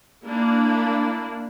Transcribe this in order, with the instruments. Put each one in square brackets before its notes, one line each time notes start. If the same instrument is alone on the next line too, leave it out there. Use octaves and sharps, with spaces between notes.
[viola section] A#3 D4 E4